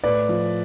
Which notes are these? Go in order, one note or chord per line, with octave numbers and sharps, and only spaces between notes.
A2 B4 D5
F3